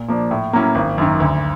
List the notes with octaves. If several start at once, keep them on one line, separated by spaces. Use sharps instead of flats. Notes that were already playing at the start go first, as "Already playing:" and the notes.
Already playing: A#2
F3 A#3 D4
A2
F#3 A#3 C#4 E4
G#1
F#2 D#3
D2